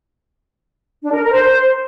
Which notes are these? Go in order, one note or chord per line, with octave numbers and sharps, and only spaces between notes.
D4
A#4
A#4
C5